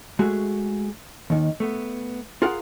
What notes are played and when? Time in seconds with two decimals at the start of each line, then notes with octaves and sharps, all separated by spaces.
0.19 G#3 A3 F#4 G#4
1.30 D#2 D#3
1.60 A3 B3
2.42 F4 G#4 A#4 F5 F#5